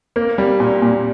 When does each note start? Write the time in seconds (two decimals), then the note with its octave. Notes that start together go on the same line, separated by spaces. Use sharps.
0.16 A#3
0.38 G3
0.60 A#2
0.82 A#2